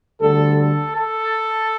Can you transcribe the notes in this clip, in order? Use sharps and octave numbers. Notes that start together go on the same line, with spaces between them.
D2 D3 G3 A4
A4
A4